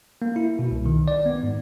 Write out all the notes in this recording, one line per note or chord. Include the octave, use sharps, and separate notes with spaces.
A#3
E4
B2
C2
D#3
D5
B3
G#2